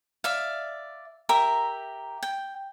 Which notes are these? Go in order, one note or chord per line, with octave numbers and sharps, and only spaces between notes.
D5 E5 F5
G4 A#4 E5 A#5
G5